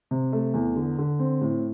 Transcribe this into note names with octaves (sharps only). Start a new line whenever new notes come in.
C3
A3
E2
D3
D3
C4
A2